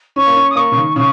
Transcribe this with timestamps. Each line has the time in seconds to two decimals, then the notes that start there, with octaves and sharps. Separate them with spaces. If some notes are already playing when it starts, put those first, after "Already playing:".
0.16 C#4 C#6
0.27 A#3
0.36 C#4
0.51 D#6
0.55 A#3 C#6
0.72 C#3
0.76 D#3
0.96 C#3 C#6